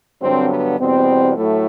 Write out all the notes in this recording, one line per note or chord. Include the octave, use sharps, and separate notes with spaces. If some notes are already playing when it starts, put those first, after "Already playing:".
G2 D3 F#3 C4
B3
E2 B2 G3 C4
A2 F#3 A3 E4